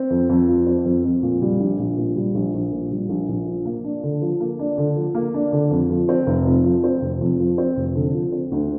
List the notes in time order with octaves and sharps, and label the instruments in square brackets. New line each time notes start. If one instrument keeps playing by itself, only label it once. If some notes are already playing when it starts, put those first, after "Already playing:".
Already playing: [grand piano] C4
F2
F2
F3
C4
F2
F2
A#2
G3
A#1
A#1
A#2
G3
A#1
A#1
A#2
G3
A#1
A#1
F3
A#3
D4
D3
F3
A#3
D4
D3
F3
A#3
D4
D3
F2
F3
C4
F1
F2
F3
C4
F1
F2
F3
C4
F1
D3
F3
C4
D2